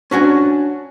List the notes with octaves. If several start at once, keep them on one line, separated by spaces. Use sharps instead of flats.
C#4 D4 F#4 G#5